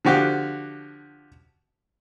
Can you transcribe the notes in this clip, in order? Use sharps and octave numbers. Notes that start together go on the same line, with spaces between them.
D3 F3 F#4 G4